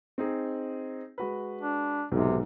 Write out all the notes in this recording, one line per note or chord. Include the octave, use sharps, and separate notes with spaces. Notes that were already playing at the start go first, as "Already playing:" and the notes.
C4 D#4 G#4
G#3 F#4 B4
D4
B1 G#2 C3 D#4